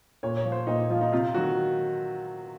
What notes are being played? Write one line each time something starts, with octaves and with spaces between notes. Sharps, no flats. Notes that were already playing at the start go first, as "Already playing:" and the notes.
A#2 C#5
C#5
F3
C5
A#2 D#4
F3 F4
D#4
C3 F4
D#3 F#3 F#4